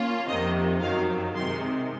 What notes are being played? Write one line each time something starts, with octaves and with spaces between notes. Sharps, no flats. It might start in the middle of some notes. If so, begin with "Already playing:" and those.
Already playing: A#3 C#4 F4
F2 C3 D#3 D#5
F#2 D#3 F#3 F5
C3 D#3 G#3 C6